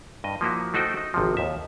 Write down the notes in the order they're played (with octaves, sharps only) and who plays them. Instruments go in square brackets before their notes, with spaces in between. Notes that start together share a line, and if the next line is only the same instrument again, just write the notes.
[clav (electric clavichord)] G2 D#5
F3 A#3 E4 F#4
A3 D#4 F#4 C5 G5
D#4
G#1 C3 F3
D#2 E5